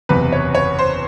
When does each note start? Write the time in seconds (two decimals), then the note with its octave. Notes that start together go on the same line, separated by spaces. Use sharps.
0.09 F#1 E2 C3 B4
0.32 C#5
0.55 C#5
0.79 C5